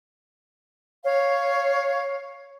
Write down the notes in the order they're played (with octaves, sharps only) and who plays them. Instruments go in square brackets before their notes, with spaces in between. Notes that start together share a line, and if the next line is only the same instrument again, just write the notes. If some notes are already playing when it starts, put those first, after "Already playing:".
[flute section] C#5 F5